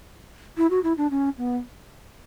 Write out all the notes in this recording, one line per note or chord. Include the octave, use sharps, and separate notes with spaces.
E4
F#4
E4
D4
C#4
B3